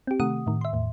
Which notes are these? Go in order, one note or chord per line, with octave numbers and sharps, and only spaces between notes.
C4 G4
C3 D#3 A3 F#5 D#6
A2 D#3
E5 C6
E2 A2